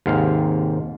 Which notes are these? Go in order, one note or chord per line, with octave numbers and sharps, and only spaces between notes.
D#2 G#2 C3 F5